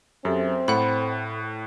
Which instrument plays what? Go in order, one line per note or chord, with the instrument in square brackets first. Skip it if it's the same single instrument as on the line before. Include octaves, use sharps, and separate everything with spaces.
[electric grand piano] F#2 [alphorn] C4 [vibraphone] G4 A4 E5
[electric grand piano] A2 [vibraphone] A4 [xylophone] F#5 B5